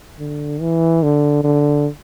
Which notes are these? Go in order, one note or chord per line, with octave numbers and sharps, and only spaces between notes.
D3
E3
D3
D3